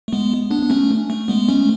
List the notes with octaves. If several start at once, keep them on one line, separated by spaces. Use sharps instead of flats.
A3
G#3 B3
B3 D4
B3
A3 C#4
A3
G#3 B3
A3 C#4